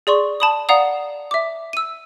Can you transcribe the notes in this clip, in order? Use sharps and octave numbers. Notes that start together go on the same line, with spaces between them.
G#4 D5 C6 C#6
A5 B5 D#6
D5 F5 F#5 A#5 D#6
E5 D6
E6 D#7